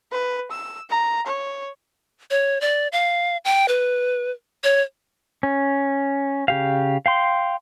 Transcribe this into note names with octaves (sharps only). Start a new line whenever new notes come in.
B4
E6
A#5
C#5
C#5
D5
F5
G5
B4
C#5
C#4
C#3 G4 F5
F5 G5 C6